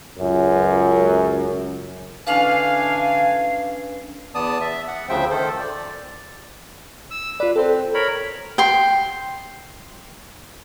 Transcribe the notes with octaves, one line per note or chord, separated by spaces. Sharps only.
C#2 F#2
D3 E3 C#4 D4 B4 F5 G#5
E2 B3 D5 A5 D#6
E5
F#5
D2 C#3 F3 C5 E5 G5
D#3 A4 C5
D5
E6
F4 B4 D5
C4 A4 C5
A#4 C#5 B5
G5 C6